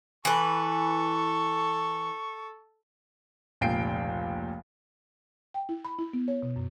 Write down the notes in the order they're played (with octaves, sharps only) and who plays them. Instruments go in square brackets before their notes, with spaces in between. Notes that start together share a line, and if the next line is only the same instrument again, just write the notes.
[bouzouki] E3 B4 [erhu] A4 [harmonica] C#6
[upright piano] F1 C#2 A#2 G5 C7 D7
[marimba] G5
E4
B5
E4
B3
C#5
B2
F#2